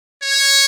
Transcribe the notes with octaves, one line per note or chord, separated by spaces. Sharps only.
C#5